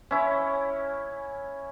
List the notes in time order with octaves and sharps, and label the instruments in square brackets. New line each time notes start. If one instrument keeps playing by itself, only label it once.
[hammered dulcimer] C#4 E4 C#5